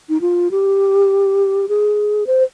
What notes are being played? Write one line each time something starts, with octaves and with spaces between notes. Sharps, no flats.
D#4
F4
G4
G#4
C5